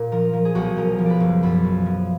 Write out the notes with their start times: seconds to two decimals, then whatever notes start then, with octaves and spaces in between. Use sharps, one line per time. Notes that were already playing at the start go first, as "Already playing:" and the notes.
Already playing: A#2 D5
0.12 F3 A#4
0.33 F3
0.45 G#4
0.55 B1 F#4
0.65 G#4
0.77 F3 A#4
0.99 F3
1.06 B4 D5
1.20 F#1
1.43 F#2 B4
1.64 F3
1.86 F3